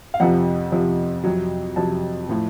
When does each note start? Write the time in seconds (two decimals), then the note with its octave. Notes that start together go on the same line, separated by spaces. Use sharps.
0.14 F5
0.20 F2 C3 F3 F#5
0.72 F2 C3 F3
1.24 F2 C3 F#3
1.76 F2 C3 F#3 A5
2.29 A2 F3